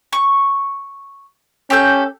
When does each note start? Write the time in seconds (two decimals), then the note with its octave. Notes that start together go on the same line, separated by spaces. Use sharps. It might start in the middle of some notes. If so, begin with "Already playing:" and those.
0.13 C#6
1.70 C#4 G4 A4 G6